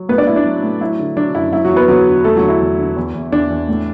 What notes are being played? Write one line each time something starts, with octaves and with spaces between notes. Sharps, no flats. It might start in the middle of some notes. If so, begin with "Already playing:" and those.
Already playing: F#3
A2 B3 B4
D4 D5
A2 E4
D4
F#3
A2
F#3 E4
D3
F#3 D4
F#2 E4
F#3 E4
F#3 F#4
E2
B3 B4
D3 F#3 F#4
D3
E2 A3 A4
F#3 F#4
D3
E4
E2
D3
E2
E2
E2 D4
E2
A2